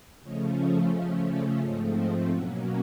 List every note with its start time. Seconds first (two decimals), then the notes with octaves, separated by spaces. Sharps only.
0.22 C#3 F3 A3 C#4 C#5 D#5
0.57 C#5 D#5
0.92 C#3 F3 A3 C#4 D#5 F5
1.26 D5 E5
1.61 G#2 F3 A3 C4 C#5 D#5
1.96 D#5 F5
2.30 B2 F#3 A#3 C#4 E5 F#5